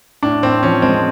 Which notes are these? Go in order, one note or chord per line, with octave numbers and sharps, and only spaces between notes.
A2 D4
A2 C4
F3 C#4
G#3 C4